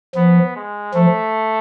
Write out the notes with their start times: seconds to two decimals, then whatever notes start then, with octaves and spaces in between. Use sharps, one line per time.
0.16 F3 B3
0.56 G#3
0.95 F3 A3